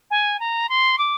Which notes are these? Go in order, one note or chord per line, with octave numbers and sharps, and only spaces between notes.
G#5
A#5
C6
D6